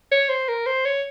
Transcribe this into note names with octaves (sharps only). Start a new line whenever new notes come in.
C#5
C5
A#4
C5
C#5